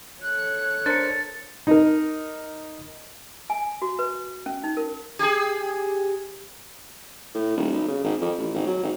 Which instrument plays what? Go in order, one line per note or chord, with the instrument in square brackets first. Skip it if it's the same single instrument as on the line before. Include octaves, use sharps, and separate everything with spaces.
[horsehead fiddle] A4 C#5 [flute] F#6
[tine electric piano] D4 A#4 C5 [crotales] A6 C#7
[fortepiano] D#4 A#4
[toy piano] G#5
F#4
B4
C#4
D#4
A#4
[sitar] G4 G#4
[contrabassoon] A2
D#1
B1
C#3
G#1
F2
A1
G#1
F#3
G#1